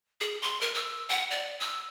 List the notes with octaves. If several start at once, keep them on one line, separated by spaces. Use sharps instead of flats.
G#4
C6
A#4
E6
F#5
D5
E6